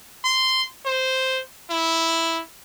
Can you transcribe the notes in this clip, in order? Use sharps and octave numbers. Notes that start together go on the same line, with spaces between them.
C6
C5
E4